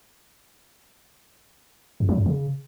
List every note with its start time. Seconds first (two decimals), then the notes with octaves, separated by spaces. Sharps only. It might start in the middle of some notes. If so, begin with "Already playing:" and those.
2.00 F2
2.09 F#3
2.17 F2
2.26 C#3